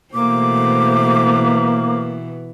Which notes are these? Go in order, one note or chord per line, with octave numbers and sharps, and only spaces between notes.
B2 E3 A3 A#3 C5 D6